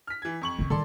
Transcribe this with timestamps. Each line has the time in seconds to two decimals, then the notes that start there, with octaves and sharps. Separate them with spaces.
0.07 F6 B6
0.22 E3 G#6
0.41 F2 C#6 F#7
0.59 D#3 C#4
0.70 D#3 G3 A4 D5 C6